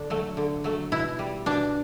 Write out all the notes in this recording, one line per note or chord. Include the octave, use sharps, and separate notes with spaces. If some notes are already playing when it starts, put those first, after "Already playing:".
Already playing: D3 D4
F#3 A3
D3
F#3 A3
B2 E4
G3
B2 D4